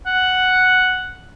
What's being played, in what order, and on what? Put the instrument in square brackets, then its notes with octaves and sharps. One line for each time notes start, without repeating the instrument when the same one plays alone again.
[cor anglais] F#5